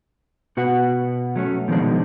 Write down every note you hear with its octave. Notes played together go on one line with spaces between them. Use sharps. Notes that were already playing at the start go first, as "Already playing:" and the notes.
B2 F#4 B4 F#5
F#3 A3 C#4
B2 D#3 F3 G3 G#3 D4